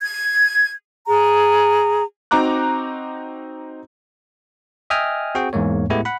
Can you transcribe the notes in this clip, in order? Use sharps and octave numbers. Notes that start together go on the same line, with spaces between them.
G#6
G#4 A#5
C4 D#4 F#4 A#5 D6 F#6
D#5 E5 G5 G#5 D#6 F6
C4 F#4 G#4 G5
E2 G#2 G#3 A#3 C#5
A2 G#3 A3 B3 E4 G4
F#5 B5